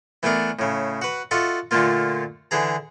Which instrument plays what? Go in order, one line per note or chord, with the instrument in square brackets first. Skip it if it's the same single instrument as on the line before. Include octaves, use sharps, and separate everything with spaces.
[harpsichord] E3 A3 B3 D4 A#4
A2 C#3
F#4 B4
F4 F#4 A4 D#5 E5
A#2 D3 A3 A#3 F4
D3 E3 G#4 A#5